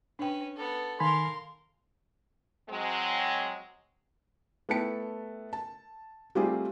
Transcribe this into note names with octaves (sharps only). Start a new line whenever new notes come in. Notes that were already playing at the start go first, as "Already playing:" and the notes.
C#4 D4 B4 G5
B3 A4
D#3 A#4 F5 G#5 B5 C6
F#3 G#3 C4
A3 B3 E4 G5 A5 C#7
A5
G3 A3 C4 F4 G4 G#4